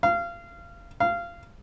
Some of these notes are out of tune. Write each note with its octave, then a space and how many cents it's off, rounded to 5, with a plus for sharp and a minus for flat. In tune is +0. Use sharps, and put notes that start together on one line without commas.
F5 -25
F5 -20